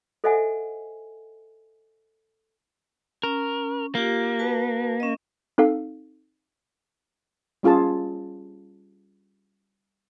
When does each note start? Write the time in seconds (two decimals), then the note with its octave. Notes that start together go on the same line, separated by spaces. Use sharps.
0.24 A4 C5 D#5 E5 F#5 G#5
3.23 C#4 A#4
3.95 A#3 F4 G4
4.39 F#4 B4 A5
5.00 C#4 D#5
5.58 C4 D#4 A4 F5
7.63 G3 C#4 F4 G#4 A5